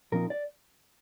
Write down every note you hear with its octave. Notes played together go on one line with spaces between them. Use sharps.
A#2 F3 C4 D#4 A#4
D5